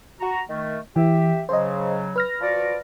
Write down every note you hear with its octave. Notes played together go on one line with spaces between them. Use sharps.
F#4 A#5
D#3 A3
E3 G4 E5
C#3 F#3 C5 D#5
B4 F6 A#6
F3 F#4 D5